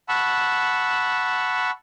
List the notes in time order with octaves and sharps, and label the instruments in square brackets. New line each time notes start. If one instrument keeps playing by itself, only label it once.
[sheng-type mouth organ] F#5 A5 B5 C#6 E6